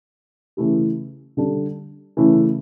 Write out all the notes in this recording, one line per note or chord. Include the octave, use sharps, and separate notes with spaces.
C#3 E3 A3 E4 G4
D3 G3 D4 A4
C#3 E3 A3 E4